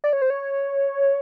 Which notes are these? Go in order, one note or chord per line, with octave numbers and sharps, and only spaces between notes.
D5
C#5
C5
C#5